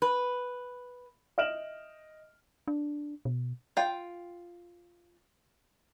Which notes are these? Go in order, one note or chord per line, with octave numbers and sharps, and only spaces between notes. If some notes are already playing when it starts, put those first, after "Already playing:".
B4
D#5 E5 F6 D7 E7 F#7
D4
B2
F4 G5